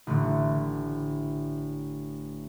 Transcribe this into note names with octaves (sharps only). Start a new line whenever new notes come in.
A1 A2 D3